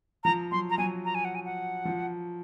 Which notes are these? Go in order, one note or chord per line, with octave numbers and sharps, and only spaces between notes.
F3 A#5
F#3 C6
A#5
F#3 G#5
A#5
G#5
F#5
G#5
F#5
F3